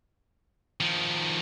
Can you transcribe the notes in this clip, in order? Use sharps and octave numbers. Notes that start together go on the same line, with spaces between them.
D#3 F3